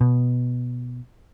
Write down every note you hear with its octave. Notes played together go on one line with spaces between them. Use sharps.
B2